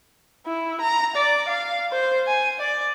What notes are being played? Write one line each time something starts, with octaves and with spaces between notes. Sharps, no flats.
E4
A#5
D5
F5
C5
G#5
D5